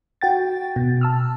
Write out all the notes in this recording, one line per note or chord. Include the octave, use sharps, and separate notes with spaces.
F#4 G5 A6
B2
A5 E6 F6